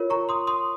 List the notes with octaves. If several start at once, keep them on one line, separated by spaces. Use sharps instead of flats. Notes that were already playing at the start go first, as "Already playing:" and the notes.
Already playing: F4 A#4 C#5
A#5 C#6
C6 D#6
C6 D#6